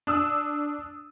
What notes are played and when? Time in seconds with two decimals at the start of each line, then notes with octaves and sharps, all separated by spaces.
0.07 D4 D#6 E6